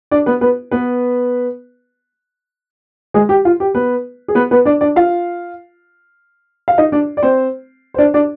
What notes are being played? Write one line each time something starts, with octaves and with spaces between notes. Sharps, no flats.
D4 D5
B3 B4
B3 B4
B3 B4
G#3 G#4
G4
F4
G4
B3 B4
G#4
B3 B4
B3 B4
D4 D5
D4 D5
F4 F5
F5
D#4 D#5
D4 D5
D5
C4 C5
C5
D4 D5
D4 D5